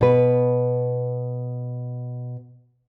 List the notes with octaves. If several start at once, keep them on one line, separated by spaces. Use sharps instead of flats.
B2 B4